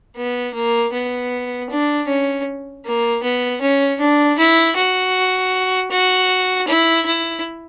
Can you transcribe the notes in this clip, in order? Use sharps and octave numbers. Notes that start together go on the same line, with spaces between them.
B3
A#3
B3
D4
C#4
A#3
B3
C#4
D4
E4
F#4
F#4
E4
E4